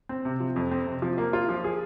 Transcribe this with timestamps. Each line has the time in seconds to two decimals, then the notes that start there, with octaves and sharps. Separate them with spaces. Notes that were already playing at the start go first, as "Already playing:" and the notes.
0.09 C4
0.25 C3
0.40 F3
0.56 F2
0.71 C4
0.87 C3
1.02 F3
1.18 A#3
1.33 F4
1.49 F3
1.64 G#4